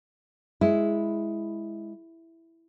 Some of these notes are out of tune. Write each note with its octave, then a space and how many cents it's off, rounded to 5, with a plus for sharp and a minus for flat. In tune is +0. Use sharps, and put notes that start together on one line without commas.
G#3 +0 E4 +0